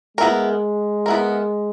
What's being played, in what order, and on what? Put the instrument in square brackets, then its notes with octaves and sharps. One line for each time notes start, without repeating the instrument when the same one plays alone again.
[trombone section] G#3 [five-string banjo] B3 E4 A#4
[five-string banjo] B3 E4 A#4